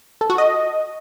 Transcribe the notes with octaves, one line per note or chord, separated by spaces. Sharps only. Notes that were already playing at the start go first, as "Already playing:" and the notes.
A4
F#4
D#5